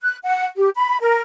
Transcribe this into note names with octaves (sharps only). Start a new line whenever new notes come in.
F#6
F#5
G4
B5
A#4